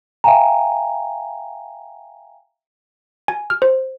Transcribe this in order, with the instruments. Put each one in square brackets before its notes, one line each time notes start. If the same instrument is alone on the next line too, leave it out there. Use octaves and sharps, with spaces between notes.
[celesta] E5 F5 G5 G#5 A#5
[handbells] G#5
F6
C5